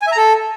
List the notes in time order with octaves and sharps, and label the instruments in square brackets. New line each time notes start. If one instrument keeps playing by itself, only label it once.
[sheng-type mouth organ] G#5
E5
A#5
A4